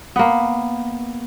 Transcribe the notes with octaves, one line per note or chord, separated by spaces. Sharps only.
A#3 B3